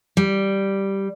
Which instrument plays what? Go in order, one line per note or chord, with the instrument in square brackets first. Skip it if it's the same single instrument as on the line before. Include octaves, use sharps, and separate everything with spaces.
[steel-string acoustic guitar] G3